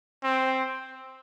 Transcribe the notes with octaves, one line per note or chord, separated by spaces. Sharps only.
C4